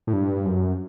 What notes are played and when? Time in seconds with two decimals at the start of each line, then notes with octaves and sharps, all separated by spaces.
0.07 A2
0.13 G2
0.45 F#2